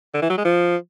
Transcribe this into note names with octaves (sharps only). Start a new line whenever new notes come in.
D3
E3
F#3
G#3
F3